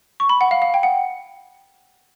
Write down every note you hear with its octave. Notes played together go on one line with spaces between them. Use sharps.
C#6
B5
F#5
F5
F5
G5
F#5